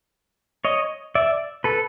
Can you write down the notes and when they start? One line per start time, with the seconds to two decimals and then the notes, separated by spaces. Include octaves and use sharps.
0.65 C#5 D#5
1.15 D5 E5
1.64 A4 B4